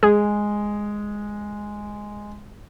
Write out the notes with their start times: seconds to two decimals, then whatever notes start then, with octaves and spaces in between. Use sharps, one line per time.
0.03 G#3 G#4